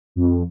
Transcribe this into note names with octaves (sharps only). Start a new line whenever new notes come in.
F2